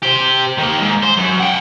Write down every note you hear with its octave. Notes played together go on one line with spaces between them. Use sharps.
G4 C5
D#3 A#3
G#2
C5
F#2
F#5 G5